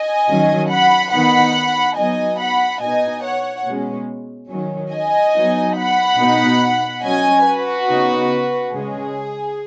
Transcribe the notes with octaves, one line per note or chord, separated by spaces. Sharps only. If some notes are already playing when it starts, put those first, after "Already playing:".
Already playing: D#5 G#5
D#3 F#3 C#4
F#5 B5
D#3 B3 D#4 F#5 B5
F#3 B3 D#4 D#5 G#5
F#5 B5
B2 B3 D#4 D#5 G#5
C#5 F#5
B2 G#3 C#4
D#3 F#3 C#4
D#5 G#5
F#3 B3 D#4
F#5 B5
B2 B3 D#4
F#3 C#4 D#5 G#5
F#4 B4
C#3 B3 D#4
C#3 G#3 C#4 G#4